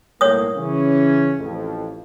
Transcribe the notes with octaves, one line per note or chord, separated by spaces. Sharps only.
B1 A2 A#3 C#5 D#6
C#3 E3 C#4
A1 F2